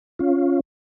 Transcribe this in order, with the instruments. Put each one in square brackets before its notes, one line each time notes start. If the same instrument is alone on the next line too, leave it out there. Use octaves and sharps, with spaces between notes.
[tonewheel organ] C#4 F4